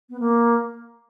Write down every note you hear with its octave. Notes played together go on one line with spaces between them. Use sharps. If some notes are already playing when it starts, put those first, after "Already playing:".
B3
A#3